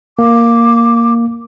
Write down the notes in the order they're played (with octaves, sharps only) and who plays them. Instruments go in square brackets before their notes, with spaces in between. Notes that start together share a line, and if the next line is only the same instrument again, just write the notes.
[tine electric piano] A#3 [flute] D6